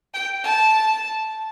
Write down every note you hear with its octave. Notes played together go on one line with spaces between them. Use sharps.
G5
A5